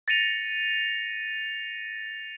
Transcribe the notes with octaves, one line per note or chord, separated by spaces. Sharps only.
A6 A#6 C#7 D#7 F7